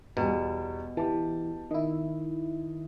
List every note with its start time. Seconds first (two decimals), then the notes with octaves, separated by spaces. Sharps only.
0.17 E2 B2 G3
0.97 E3 G4 A5
1.71 D#3 E4 D#5